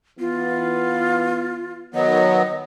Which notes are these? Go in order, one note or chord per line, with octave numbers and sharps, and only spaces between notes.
E3 B3 F4
D#3 F#3 B3 D#5